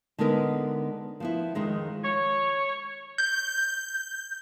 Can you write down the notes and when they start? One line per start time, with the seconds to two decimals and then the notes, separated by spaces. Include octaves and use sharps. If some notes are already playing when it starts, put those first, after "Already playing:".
0.18 D3 G#3 B3 D#4 A#4 B4
1.20 F3 B3 E4
1.55 F2 D#3 G#3 D#4
2.04 C#5
3.18 G6